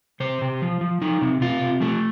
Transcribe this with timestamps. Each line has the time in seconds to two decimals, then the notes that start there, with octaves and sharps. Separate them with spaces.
0.20 C3 C5
0.41 C3
0.61 F3
0.81 F3
1.01 F3 D#4
1.21 C3
1.41 C3 F4
1.61 C3
1.80 F3 A3